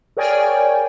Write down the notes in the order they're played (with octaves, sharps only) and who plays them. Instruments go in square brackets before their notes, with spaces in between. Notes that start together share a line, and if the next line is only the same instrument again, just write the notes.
[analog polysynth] G#4 A#4 C#5 D5 G5 G#5